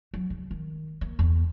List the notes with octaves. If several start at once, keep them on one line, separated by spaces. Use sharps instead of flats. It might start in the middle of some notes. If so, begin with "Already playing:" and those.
F#3
C#3
D#3
A#3
E2